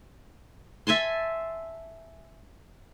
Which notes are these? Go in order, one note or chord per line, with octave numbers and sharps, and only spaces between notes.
E5 G#5 A5 C6